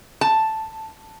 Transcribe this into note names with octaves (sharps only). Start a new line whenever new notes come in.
A5